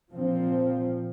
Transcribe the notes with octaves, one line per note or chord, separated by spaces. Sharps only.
A#2 F3 C4